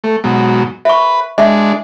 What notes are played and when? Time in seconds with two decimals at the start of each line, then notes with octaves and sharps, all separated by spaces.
0.04 A3
0.24 G#2 B2 F#3
0.85 B4 E5 C#6
1.38 G#3 D4 D#5 E5